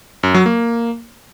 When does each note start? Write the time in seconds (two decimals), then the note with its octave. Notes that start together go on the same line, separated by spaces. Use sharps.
0.23 F#2
0.34 F#3
0.46 A#3